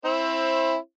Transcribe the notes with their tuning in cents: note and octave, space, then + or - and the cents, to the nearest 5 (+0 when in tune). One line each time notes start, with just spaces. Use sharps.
C4 +25 E4 +0 C5 +30